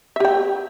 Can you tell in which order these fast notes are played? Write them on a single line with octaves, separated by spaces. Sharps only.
E5 G4 G5